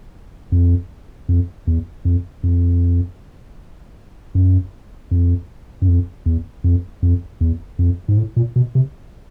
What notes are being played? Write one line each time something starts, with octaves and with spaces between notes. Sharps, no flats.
F2
F2
E2
F2
F2
F#2
F2
F#2
F2
E2
F2
F2
E2
F2
G#2
A2
A#2
B2
C3